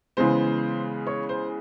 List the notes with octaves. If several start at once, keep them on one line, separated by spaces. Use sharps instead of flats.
C#3 E3 G#3 B3 C5
C#5
C5